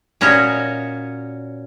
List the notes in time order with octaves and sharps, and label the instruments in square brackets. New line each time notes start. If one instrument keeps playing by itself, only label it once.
[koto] A#2 C#4 F#4 C#5 D#5